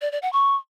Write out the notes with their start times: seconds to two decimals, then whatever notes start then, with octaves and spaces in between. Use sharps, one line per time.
0.02 D5
0.12 D5
0.22 F#5
0.33 C#6